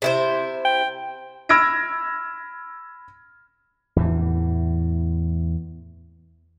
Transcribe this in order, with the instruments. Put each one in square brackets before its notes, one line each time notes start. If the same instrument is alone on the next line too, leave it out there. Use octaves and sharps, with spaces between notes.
[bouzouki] C3 E4 C5
[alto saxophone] G5
[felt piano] B5 E6 F6 G#6 A#6 D7
[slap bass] E2 A2 E3